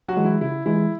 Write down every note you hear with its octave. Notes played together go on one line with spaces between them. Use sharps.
F#3 F#4
E3 G#3
E4
C#3 E4
E3 G#3 E4